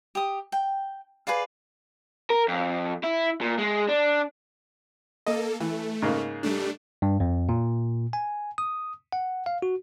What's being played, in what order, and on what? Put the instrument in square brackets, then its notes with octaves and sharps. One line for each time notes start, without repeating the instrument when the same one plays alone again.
[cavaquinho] G4 D#6
G5
G#4 B4 D5 F5
[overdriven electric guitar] A#4
F2
E4
A#2
G#3
D4
[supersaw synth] A#3 A4 [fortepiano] D#5
[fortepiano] E3 [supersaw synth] A3
[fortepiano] G#2 C#3 A#3
[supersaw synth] G3 A3 D4
[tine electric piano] G2
F2
A#2
G#5
D#6
F#5
F5
F#4